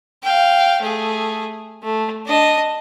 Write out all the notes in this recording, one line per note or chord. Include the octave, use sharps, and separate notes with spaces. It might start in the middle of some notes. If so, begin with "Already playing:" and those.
F5 G5
A3 G#4
A3
D4 D#5